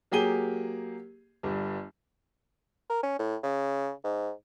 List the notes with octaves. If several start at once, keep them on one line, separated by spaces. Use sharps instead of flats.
F#3 A#3 G4 G#4 D#7 G7
G1 G2
A#4
C#4
A2
C#3
G#2